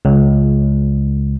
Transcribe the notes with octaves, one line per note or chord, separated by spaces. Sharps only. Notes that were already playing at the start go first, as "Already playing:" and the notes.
C#2